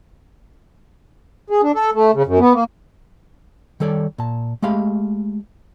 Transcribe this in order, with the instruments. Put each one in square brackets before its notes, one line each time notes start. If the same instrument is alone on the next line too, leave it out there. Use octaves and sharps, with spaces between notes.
[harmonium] G#4
D4
A4
A3
C#3
F#2
B3
A#3
[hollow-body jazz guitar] D#3 G3 A4 C#5 D5
A#2 A5
G#3 A3 G4 F5 B5